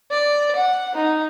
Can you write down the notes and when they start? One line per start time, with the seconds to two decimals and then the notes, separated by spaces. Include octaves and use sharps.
0.11 D5
0.55 F#5
0.94 D#4